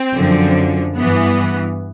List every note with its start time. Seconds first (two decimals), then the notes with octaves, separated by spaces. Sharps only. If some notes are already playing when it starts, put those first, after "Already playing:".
Already playing: C4
0.13 F#2 D3 F3
0.96 G2 E3 B3